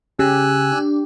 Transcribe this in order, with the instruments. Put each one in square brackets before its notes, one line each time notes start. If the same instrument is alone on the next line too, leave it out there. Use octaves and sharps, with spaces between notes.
[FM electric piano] C#3 [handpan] G4 [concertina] G#5 E6 F#6
[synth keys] D4